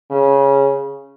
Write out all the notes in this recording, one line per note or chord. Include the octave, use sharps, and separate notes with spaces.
C#3